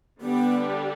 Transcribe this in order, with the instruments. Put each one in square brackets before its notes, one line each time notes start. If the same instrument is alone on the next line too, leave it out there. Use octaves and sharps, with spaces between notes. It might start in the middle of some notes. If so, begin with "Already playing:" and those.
[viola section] D3 G3 D4 G4 [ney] B3